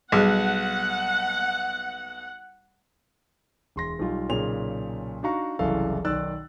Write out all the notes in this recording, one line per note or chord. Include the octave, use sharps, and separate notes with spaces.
B1 G3 G#4 F#5
E1 C6 A#6
B1 G3 F4
B1 A#2 C#3 F7
D4 D#4 F#4 F5 A#5 C#6
F#1 C2 F#2 E3 A4 F5
B1 D#3 D5 E6 F#6 A6